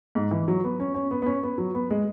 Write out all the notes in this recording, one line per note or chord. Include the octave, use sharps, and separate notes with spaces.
G#2
E3
F#3
B3
C#4
C#4
B3
B3
C#4
B3
F#3
B3
G#3